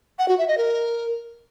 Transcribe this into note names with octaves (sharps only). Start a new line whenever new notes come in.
F#5
F#4
E5
D#5
A#4